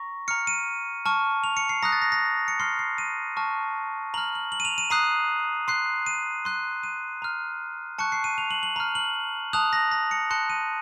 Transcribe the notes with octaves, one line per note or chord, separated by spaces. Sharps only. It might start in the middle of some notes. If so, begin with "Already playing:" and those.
Already playing: A#5 C#6 A#6
A#5 F6 C#7
D#7
A5 C#6 F6
F7
C#7
C7
A#5 D#6 F#6 A#6
A6
A#6
A#6
C#7
C6 F6 C7
C7
D#7
A5 C#6 F6
A#5 F6 F#7
F#7
F#7
D#7
F7
D#7
A#5 D#6 F#6 C7
C6 F#6 C7
D#7
C6 F#6
D#7
A#5 F6
A5 C#6 F#6 C#7
C7
D#7
F7
F#7
F#7
A#5 F6
F#7
A5 D#6 F#6 F7
A#6
A#6
C#7
A5 C6 F#6 C#7
D#7